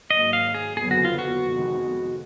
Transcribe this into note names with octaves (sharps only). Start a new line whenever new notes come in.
G#1 G#2 F#3 A#3 D#5
F5
G#4
F#1 F2 D3 F#3 B3 G#4
F#4
F4
F#4
F1 F2 D#3 G#3 B3